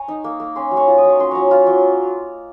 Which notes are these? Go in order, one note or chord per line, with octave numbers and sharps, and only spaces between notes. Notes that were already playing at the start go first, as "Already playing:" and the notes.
Already playing: G#5 A#5 C#6
D#4
A#3
A#3
C#4 G#5 C6
F#3
A#5 C#6
F4
D#6
F#3
C#6
C#4 C6
F#3 A#5 C#6
F4
F#3